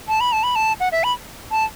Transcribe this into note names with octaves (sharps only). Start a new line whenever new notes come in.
A5
B5
A5
B5
A5
F#5
E5
B5
A5